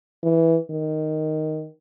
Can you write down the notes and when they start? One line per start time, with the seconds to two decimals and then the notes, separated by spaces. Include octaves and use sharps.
0.23 E3
0.70 D#3